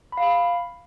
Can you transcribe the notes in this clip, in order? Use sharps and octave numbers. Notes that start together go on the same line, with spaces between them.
B5
F5
B5